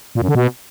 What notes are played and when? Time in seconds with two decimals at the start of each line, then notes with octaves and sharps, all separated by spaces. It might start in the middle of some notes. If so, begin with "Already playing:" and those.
0.15 A#2
0.22 F#2
0.28 D3
0.35 B2